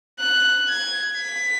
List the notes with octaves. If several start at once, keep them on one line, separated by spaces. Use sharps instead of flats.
F#6
G#6
B6